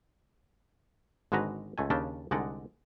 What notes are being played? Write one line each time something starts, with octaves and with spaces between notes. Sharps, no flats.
G#1 D3 G#3 F#4 B4 A#5
C#2 A3 G#5
D#2 C#3 C#4 D4 G5 A5
C2 D3 G#3 D#4 D5 F#5